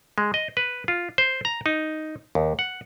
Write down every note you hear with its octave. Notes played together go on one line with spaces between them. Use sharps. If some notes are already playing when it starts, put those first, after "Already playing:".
G#3
D#5
B4
F4
C5
A#5
D#4
D#2
F#5